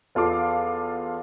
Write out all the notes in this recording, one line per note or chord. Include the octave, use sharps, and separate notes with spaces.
E2 F4 A4 F5 D6